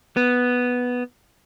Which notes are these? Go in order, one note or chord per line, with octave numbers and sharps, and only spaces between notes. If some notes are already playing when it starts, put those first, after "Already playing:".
B3